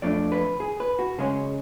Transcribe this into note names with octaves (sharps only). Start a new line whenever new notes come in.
F2 F3 A3 D4 D5
B4
G#4
B4
F#4
C#3 G#3 C#4 G#4